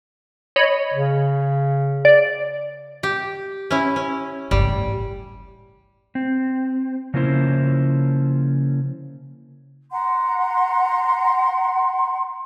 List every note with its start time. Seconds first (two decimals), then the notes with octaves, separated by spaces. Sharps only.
0.56 C#5 D#5 B5
0.94 C#3
2.05 D5
3.03 G4
3.71 C#4 E4
3.96 C#4
4.51 G1 C#2 G3
4.68 A1
6.15 C4
7.14 C#3 F3 A#3 C#4 E4 C5
9.91 F#5 A#5 C6